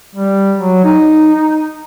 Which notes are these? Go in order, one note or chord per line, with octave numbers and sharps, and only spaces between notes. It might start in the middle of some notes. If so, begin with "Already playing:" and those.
G3
F#3
D#4